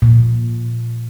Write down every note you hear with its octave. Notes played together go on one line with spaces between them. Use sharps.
A#2